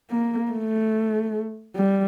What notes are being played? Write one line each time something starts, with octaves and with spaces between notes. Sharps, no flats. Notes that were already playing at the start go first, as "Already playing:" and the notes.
A#3
A3
G3